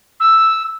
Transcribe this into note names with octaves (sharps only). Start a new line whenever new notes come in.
E6